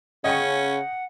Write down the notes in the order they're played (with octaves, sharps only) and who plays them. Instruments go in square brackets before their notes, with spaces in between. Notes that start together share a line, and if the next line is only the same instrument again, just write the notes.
[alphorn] C#3 [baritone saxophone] C#4 [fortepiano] D#5 G5 C#6 [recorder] F#5